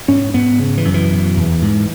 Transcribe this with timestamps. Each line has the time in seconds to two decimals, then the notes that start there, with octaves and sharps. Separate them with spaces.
0.08 G#2 C#4
0.34 G#2 B3
0.59 C#3
0.77 E3
0.85 F#2
0.94 E3
1.11 B2
1.37 E2
1.62 G#2